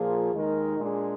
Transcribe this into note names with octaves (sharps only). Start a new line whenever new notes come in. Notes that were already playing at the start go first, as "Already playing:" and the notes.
Already playing: A#2 F3 A#3 F4 G#4
D#2 D#3 G#3 D#4 A#4
A#2 G#3 D4 G#4